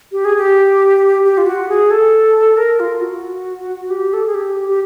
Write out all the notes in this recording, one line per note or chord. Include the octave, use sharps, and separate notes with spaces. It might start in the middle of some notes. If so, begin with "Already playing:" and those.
G4
G#4
G4
G4
F4
F#4
G#4
A4
A#4
F4
F#4
G4
A4
G#4
G4
G4